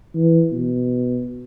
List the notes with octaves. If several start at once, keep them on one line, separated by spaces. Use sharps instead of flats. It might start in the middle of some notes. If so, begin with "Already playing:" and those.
E3
B2